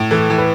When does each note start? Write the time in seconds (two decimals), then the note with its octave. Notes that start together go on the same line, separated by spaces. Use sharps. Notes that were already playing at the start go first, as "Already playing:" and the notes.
Already playing: A2
0.11 E3 A4
0.30 E3
0.38 B4